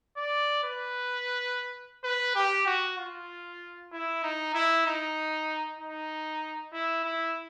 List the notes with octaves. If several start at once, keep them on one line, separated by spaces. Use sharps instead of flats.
D5
B4
B4
G4
F#4
F4
E4
D#4
E4
D#4
D#4
E4
E4